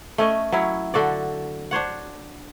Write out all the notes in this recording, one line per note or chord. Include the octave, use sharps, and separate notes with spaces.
A3 C#4 D#5
F#3 C#4 E4
D3 F#4 A4 D5
D4 C5 C#5 F#5